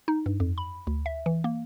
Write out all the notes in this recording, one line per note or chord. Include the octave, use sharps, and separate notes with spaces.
D#4
G2
F2
B5
D2
E5
E3
A#3